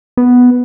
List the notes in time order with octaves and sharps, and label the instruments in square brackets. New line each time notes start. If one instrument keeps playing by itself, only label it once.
[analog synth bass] B3